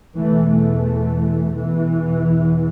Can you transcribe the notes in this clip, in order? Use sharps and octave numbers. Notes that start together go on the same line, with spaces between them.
E2 B2 E3 A3
E3 A3
E2 B2 E3